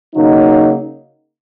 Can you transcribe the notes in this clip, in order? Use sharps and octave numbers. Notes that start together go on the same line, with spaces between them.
C#3 F#3 A#3 D#4